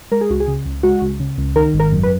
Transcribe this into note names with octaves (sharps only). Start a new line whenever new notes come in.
G#3 A#4
G#4
C#2 F#4
G#4
C#3
C#2
G#3 F#4
C#2
C#3
C#2
D#3 A#4
G#1
A#4
F#2
B4